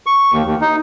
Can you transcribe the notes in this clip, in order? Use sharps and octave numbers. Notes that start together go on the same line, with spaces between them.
C#6
D#2
D#2
D#4